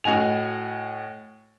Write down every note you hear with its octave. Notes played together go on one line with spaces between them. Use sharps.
A2 F#4 D#5 G#5 F7